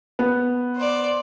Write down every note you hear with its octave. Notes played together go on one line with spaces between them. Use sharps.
B3
C5 D5